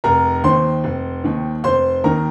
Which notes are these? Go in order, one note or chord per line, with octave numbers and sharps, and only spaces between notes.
F1 A#4 A#5
D#2 D#3 C5 C6
F1
D#2 D#3
F1 C5 C6
D#2 D#3 A#4 A#5